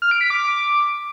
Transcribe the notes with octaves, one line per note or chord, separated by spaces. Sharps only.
F6
D7
B6
D6